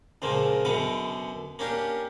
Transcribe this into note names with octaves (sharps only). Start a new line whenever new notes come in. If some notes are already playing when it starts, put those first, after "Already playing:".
C#2 A#2 C#3 F3 A#3
F#2 B2 D3 B3 D6
A#3 C#4 D4 G4